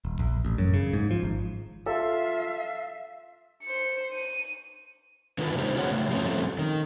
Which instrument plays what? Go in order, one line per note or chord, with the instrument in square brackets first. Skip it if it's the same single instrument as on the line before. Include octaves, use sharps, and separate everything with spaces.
[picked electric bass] D#1
A#1
A1
F#2
C#3
G#2
F3
G#1
[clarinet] F4 [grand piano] A4 [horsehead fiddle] E5 [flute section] F5
[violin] C5 C#7
D#7
[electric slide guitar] D3 D#3 B3 F4
C#3 G#3 D#4 G4 C5
C#4 F4 G4 B4 C#5 F#5
C#3 A3
F3 G3 A3 C4 C#4
D#3